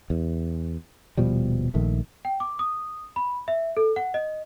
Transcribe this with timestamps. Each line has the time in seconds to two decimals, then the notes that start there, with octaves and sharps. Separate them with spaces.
0.10 E2
1.17 D#1 B2 F3 G3
1.74 A#1 D#3 A3
2.25 G5
2.40 D6
2.59 D#6
3.16 B5
3.48 E5
3.77 A4
3.96 F#5
4.14 D#5